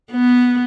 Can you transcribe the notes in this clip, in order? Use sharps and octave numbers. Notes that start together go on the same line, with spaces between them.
B3